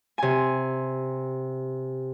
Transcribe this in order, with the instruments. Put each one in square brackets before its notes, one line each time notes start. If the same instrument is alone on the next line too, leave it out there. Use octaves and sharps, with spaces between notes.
[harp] C3 G#5